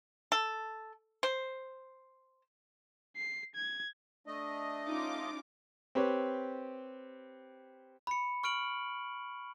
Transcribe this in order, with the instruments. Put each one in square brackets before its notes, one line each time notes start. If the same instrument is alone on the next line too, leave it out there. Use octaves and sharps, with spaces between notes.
[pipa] A4
C5
[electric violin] C7
G#6
[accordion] A3 D#5 [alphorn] D4
[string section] C#4 F4 D6 [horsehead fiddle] D#4
[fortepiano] C4 G4 B4 C#5
[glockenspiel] B5 C#7
C#6 F6 D7 F#7